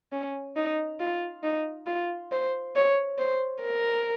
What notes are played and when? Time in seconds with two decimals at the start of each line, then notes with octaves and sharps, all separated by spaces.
0.12 C#4
0.56 D#4
1.00 F4
1.44 D#4
1.87 F4
2.32 C5
2.76 C#5
3.19 C5
3.62 A#4